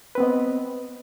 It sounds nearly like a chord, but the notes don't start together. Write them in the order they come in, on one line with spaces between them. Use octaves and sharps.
B4 C4 B3 D#5